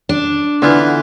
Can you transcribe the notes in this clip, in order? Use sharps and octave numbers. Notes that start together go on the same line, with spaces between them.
D4
D3 E3 B3 E4 F4